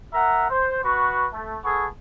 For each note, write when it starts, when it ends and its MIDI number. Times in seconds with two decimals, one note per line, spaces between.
0.13 0.47 70
0.13 0.47 76
0.13 0.47 78
0.13 0.47 82
0.50 0.80 72
0.83 1.26 59
0.83 1.26 66
0.83 1.26 71
0.83 1.26 85
1.33 1.58 57
1.64 1.85 59
1.64 1.85 68
1.64 1.85 69
1.64 1.85 85